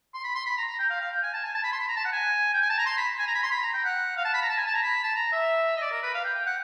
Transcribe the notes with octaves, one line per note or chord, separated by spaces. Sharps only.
C6
B5
C6
B5
A#5
A#5
G5
F5
F5
G5
G#5
A5
G#5
A5
B5
C6
B5
A#5
A5
F#5
G#5
G5
G#5
A5
A#5
C6
B5
G#5
A#5
B5
C6
B5
A#5
G5
F#5
F5
A5
B5
A#5
A5
G#5
A5
A#5
B5
A5
A#5
E5
D#5
D5
A#4
B4
F5
G5
G5
F#5